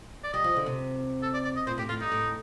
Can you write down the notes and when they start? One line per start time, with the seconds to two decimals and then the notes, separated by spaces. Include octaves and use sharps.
0.24 D5
0.33 G3 D#5
0.44 F3
0.56 D3
0.66 C3
1.23 A4
1.34 D5
1.44 D5
1.56 D#5
1.67 A#2 C5
1.78 A2 G4
1.89 A2 F4
2.00 G2 D#4
2.12 A2